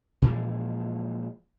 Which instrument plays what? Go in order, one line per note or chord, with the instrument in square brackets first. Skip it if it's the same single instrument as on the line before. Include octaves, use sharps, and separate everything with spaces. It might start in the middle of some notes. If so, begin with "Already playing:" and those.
[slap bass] A#2 E3 F3 G#3